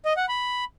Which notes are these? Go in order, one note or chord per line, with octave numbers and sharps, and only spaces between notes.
D#5
F#5
B5